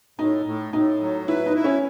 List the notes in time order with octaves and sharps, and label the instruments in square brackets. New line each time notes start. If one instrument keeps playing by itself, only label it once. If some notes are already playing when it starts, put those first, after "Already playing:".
[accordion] A2 [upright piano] D#4
[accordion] A2
[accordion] A2 [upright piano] D#4
[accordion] F#3
[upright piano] E4 [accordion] B4
[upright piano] D#4
[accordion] E4
[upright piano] C#4